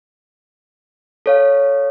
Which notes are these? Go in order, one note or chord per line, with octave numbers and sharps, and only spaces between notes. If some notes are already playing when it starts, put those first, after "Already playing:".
A4 C#5 F5